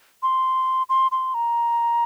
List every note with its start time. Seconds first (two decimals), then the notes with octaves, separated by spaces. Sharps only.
0.23 C6
0.89 C6
1.11 C6
1.34 A#5